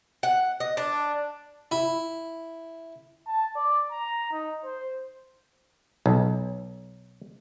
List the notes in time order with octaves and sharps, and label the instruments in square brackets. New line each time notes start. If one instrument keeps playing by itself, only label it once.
[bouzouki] F#5
D#5
D4
[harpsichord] E4
[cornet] A5
D5
A#5
D#4
C5
[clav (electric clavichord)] B1